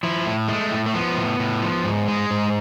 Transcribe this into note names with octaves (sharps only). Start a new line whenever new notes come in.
F3 E4
A2
G#3 A3
A2
A3
F3 B3
A2
A2
F3
G#2
G#3
G#2